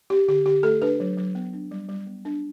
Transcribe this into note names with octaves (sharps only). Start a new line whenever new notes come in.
C4 G4
D3 G4
D3 G4
A3 A4
D4 B4
F#3
F#3
B3
D4
G3
G3
B3
D4